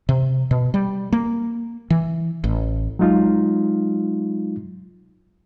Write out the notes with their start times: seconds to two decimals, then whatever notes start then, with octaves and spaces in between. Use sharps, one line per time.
0.09 C3
0.51 B2
0.74 G3
1.13 A#3
1.90 E3
2.44 A1
2.99 F#3 G#3 D#4 F4